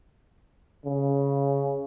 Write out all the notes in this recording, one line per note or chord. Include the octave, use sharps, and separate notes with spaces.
C#3